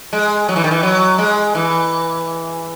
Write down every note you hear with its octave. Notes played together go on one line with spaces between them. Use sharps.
G#3
F#3
E3
D#3
E3
F#3
G#3
E3